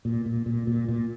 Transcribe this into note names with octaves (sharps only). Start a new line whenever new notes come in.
A#2
A#2
A#2
A#2
A#2